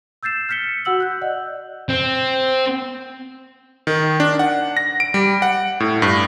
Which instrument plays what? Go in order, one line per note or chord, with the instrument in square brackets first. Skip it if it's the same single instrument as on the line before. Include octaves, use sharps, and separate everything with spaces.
[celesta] E6 G6 A6 C7 E7
F6 G6 B6 C#7 G7
F#4 F#5 E6 F#7
F#6 G6
D5 D#5 F#5
[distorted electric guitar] C4
[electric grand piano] D#3
D4
F#5
A#6
D7
G3
F#5
A2
G2